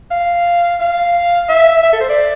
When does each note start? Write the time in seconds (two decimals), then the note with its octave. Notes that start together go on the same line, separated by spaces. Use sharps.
0.11 F5
0.81 F5
1.49 E5
1.83 E5
1.93 A4
2.00 C5
2.09 D5